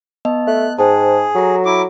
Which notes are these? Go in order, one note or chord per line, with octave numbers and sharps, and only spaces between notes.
B3 D#5 A5
A3 F#6
G#2 G#4 C5 G5 A5
F#3 A4 A#5
E4 D6